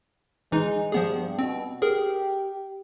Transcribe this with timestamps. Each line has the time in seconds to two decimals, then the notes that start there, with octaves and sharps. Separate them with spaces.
0.52 E3 G#3 D#4
0.92 G2 F3 B3 G#4
1.39 B2 C4
1.82 G4 G#4 A#4